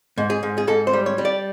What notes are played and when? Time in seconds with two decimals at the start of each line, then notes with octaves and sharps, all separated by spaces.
0.18 G#2
0.30 G#4
0.43 G#2
0.58 G#4
0.67 G#2 A4
0.87 C5
0.93 G3
1.06 C#5
1.18 G3
1.25 D5